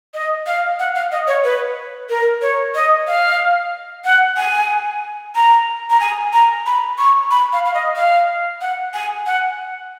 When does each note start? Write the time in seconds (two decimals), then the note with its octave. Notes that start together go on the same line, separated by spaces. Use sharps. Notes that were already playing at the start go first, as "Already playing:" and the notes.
0.14 D#5
0.47 F5
0.79 F#5
0.95 F5
1.12 D#5
1.27 C#5
1.44 B4
2.09 A#4
2.42 C#5
2.75 D#5
3.07 F5
4.05 F#5
4.37 G#5
5.35 A#5
5.90 A#5
6.00 G#5
6.33 A#5
6.66 B5
6.98 C#6
7.31 B5
7.53 F5
7.65 F5
7.74 D#5
7.96 F5
8.61 F#5
8.94 G#5
9.26 F#5